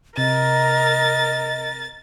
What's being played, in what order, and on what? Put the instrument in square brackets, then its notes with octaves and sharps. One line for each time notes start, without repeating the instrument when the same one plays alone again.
[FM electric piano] C3 [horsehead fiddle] A#4 [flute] D#5 [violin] A6